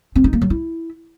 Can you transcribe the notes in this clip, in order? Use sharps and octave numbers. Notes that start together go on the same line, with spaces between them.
C4
D#4
A#3
F#3
E4